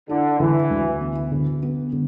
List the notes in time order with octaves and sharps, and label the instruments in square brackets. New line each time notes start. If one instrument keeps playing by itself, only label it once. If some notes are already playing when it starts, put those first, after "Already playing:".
[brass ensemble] D3 [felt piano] E4
[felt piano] D3 [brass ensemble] E3
[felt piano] D2
B3
D3
B3
D3